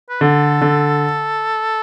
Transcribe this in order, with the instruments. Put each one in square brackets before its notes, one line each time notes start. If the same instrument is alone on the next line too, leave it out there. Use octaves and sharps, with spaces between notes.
[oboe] B4
[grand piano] D3 [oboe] A4
[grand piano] D3